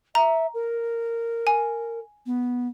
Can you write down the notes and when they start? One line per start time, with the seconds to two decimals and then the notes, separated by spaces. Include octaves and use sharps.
0.15 E5 A#5
0.54 A#4
1.47 G#5
2.26 B3